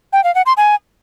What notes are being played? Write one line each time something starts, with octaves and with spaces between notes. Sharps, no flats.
G5
F5
F#5
C6
G#5